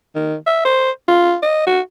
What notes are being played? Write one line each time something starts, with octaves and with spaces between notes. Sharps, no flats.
D#3
E5
C5
F4
D#5
F#4